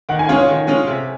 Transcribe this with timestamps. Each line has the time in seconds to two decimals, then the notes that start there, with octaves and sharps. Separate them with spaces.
0.09 D#3 F#5
0.19 G#5
0.28 G#3 C#4 F4 G#4 F5
0.39 C#5
0.49 D#3
0.67 G#3 C#4 F4 G#4
0.87 C3